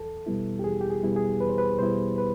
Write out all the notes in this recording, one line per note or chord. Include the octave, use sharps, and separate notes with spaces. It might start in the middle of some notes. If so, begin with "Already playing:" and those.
Already playing: E2 A4
B2 G3 B3 E4
G4
E2 G#4
G4
G#4
B2 G3 B3 E4
G#4
E2 B4
C5
B4
B2 G3 B3 E4 C5
B4